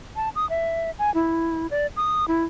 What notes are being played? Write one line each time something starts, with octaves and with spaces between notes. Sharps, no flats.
A5
D#6
E5
G#5
E4
D5
D#6
E4